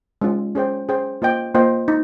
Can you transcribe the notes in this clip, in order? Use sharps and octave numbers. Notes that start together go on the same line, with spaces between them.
G#3 C#4 F4
C#4 G#4 C5 G5
C#4 G#4 C5 G5
A#3 F4 C5 D#5 G5
A#3 F4 C5 D#5 G5
D#4